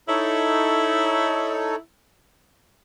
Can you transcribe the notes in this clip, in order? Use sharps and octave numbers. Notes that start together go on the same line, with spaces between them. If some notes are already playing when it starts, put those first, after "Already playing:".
D#4 E4 A4 C#5